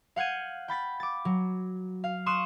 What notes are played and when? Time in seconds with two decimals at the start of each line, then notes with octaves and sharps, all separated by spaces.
0.16 F5 F#5 G6 G#6 D#7
0.68 G5 B5 A6 B6
1.00 D6 A6
1.25 F#3
2.04 F5
2.26 C6 C#6 D#6 F#6 E7